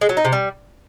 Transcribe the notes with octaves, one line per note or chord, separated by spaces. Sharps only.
G#3
F#3
D#4
C3
G3